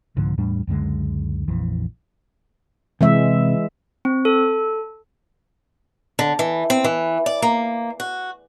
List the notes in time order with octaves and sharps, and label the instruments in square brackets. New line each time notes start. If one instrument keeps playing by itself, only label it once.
[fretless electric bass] C2 G#2 D3 F3
E2 A2 G3 D4
C#2 F#2 D3 G#3
A#1 F2 E3
[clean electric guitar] C3 [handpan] E3 G#3 E5
[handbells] C4
A4
[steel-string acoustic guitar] D3
E3
C4
E3
D5
A#3
F#4